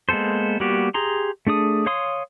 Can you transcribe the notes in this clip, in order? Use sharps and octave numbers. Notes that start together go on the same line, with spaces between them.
G#3 A#3 B3 A4 C5
G3 A#3 B3 F#4 G4
G4 G#4 A#5 C6
A3 D4 G#4 D#6
C#5 F5 C6 D#6